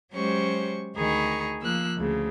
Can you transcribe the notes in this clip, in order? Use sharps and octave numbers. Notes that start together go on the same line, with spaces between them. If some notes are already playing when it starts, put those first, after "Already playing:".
F#3 G#3 C#4 G4 C5 C#6
D2 D#3 G#4 A#5 B5 C#6
F3 A#3 E6 F#6
D2 C#3